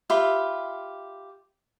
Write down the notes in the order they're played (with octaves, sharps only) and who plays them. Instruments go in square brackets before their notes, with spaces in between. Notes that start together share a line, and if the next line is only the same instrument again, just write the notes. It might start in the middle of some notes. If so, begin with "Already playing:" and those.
[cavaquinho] F4 G4 E5 B5